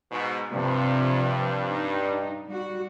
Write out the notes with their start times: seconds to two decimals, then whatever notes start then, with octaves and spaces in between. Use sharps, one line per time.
0.11 G#2 B2
0.52 G2 C3 F3
1.72 D#4
2.47 G3 F#4